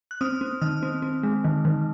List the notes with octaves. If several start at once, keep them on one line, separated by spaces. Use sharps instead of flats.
F#6
C4 D#6 F6
C4
D#3 D#6 F6
C4
C4
G#3
D#3
D#3